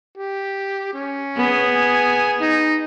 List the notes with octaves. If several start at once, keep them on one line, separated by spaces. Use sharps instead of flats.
G4
C#4
B3 G#4
G#5
D#4